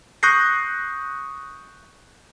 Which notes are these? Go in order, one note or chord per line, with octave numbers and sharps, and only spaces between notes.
C#6 D#6 F#6 G6 A#6 C7